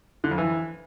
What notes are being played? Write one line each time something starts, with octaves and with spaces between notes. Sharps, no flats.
D3
F2
E3